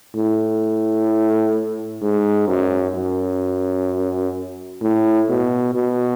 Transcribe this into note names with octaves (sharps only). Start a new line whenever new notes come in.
A2
G#2
F#2
F#2
A2
B2
B2